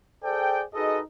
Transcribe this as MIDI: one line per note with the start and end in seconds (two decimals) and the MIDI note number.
0.24 0.62 68
0.24 0.62 69
0.24 0.62 72
0.24 0.62 74
0.24 0.62 79
0.74 1.00 63
0.74 1.00 66
0.74 1.00 68
0.74 1.00 69
0.74 1.00 71
0.74 1.00 75